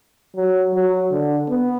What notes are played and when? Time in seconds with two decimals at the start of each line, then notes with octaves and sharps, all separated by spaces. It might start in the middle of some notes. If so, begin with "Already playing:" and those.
0.36 F#3
0.74 F#3
1.12 D3
1.49 B3